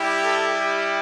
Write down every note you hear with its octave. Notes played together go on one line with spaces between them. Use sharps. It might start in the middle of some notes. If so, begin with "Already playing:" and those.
Already playing: G3 E4 G4
A4
G4